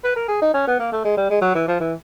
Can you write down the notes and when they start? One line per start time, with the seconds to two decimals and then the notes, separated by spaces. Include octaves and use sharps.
0.04 B4
0.16 A#4
0.28 G#4
0.42 D#4
0.54 C#4
0.67 B3
0.79 A#3
0.92 A3
1.05 G#3
1.17 G3
1.30 G#3
1.41 F#3
1.55 E3
1.68 F3
1.80 E3